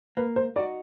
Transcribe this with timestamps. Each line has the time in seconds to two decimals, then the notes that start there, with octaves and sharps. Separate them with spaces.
0.17 A#3 B4
0.36 C5
0.56 D#4 F#4 D5